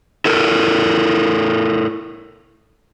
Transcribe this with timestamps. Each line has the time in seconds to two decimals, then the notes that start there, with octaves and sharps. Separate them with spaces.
0.25 E4 A4 A#4